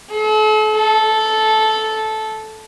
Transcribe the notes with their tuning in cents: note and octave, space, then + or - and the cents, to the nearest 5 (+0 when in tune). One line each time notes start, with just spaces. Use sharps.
A4 -40
A4 -10